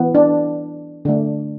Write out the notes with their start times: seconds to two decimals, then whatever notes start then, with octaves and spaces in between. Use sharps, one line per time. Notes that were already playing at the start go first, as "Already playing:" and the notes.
Already playing: E3 B3
0.15 D4
1.05 D3 A3 D4